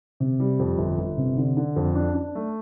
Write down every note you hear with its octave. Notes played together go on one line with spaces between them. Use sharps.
C3
G3
F2
G1
G1
C3
D3
D3
F2
D4
D4
A3